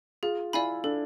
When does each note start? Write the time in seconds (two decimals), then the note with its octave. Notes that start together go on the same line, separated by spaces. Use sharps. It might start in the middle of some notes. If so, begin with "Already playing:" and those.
0.23 F4 G#4
0.53 E4 D5 F5 G#5 B5
0.84 D4 A4